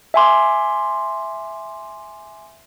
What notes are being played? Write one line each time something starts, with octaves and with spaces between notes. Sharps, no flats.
E5 G#5 C6 D6